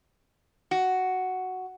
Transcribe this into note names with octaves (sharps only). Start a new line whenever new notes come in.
F#4